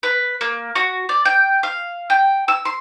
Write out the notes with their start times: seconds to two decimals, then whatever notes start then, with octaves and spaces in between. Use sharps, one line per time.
0.03 B4
0.41 A#3
0.76 F#4
1.09 D5
1.25 G5
1.63 F5
2.10 G5
2.48 E6
2.65 C6